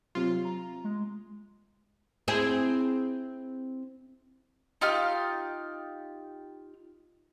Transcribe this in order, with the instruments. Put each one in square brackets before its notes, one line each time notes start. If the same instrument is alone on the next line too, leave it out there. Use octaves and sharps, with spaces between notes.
[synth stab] C3 F4 [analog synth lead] F#3
[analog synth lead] A#5
G#3
[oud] C4 E4 G#4
[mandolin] D#4 F4 G4 F6